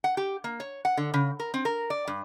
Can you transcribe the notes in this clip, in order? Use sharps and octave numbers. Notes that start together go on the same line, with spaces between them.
F#5
G4
A#3
C#5
F#5
D3
C#3
A#4
C4
A#4
D5
G2